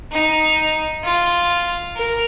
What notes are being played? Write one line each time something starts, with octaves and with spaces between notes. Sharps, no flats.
D#4
F4
A#4